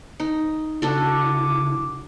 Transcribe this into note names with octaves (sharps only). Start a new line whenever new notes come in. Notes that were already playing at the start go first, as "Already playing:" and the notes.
D#4
C#3 D4 E4 F#4 A4 D6